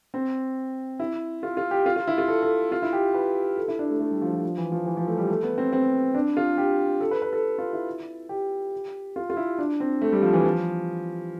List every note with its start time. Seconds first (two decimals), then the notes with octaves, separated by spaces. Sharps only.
0.14 C4
1.00 E4
1.43 F4
1.57 F4
1.71 G4
1.86 F4
1.96 F4
2.07 E4
2.18 F4
2.28 A4
2.42 A4
2.72 F4
2.82 E4
2.93 G4
3.14 B4
3.57 A4
3.68 E4
3.79 D4
3.90 A3
4.00 A3
4.11 G3
4.22 F3
4.33 F3
4.43 F3
4.58 E3
4.72 F3
4.86 E3
4.97 F3
5.07 A3
5.18 G3
5.30 A3
5.43 B3
5.58 C4
5.73 C4
6.15 D4
6.37 F4
6.58 G4
7.01 A4
7.11 B4
7.22 B4
7.33 A4
7.58 F4
7.73 E4
8.29 G4
9.16 F4
9.30 F4
9.37 E4
9.58 D4
9.80 C4
10.02 A3
10.12 G3
10.22 F3
10.33 E3
10.45 F3